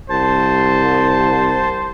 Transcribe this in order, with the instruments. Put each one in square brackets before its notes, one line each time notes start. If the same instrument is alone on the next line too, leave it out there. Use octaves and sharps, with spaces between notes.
[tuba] C2 [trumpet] C5 [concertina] A5